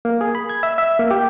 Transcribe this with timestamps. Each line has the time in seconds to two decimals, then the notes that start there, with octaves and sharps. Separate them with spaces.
0.05 A#3
0.21 G#4
0.35 B5
0.49 G#6
0.63 E5
0.78 E5
0.99 A#3
1.11 G4